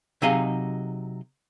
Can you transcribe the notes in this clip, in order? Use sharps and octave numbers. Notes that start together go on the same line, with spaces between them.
C3 F#3 D#4 G#4 D#5 F5